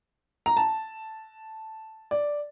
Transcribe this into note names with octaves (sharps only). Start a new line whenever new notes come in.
A#5
A5
D5